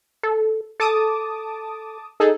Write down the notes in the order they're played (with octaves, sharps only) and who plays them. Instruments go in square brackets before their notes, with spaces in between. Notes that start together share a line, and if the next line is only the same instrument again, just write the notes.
[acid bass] A4
[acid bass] A4 [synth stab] A5 D6 D#6
[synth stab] D#4 G#4 A4